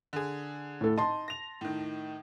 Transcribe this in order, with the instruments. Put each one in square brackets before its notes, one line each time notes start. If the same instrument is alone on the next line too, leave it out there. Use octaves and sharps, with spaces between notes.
[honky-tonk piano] D3 G#4
[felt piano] A2 A4
[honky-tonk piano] D#4 [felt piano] A5 C6
[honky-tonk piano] A#6 F7
A2 D#3